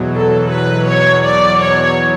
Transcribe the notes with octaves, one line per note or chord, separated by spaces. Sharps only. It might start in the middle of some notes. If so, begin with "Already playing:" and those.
Already playing: E2 B2 F#3
A4
B4
C#5
D5
C#5